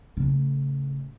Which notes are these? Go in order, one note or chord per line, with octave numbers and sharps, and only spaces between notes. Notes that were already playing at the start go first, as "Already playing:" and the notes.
A2 C#3